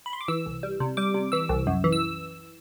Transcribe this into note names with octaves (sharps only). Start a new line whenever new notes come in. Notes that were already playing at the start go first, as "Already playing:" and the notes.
B5
C6
D6
E3 E6
C2
G3
C3
G3 D6
C3
E3 E6
C2
F#2
E3
E6